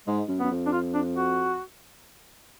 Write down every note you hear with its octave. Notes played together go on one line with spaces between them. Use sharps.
G#2 G#3
F#2
F#2 B3
F2
D4
F4
D4
F#4